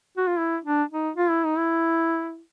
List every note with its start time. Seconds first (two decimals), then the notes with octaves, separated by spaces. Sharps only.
0.17 F#4
0.27 F4
0.38 E4
0.65 D4
0.91 D#4
1.17 F4
1.30 E4
1.44 D#4
1.57 E4